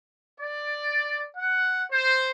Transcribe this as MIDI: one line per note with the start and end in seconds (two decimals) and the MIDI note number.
0.39 1.26 74
1.36 1.85 78
1.91 2.31 72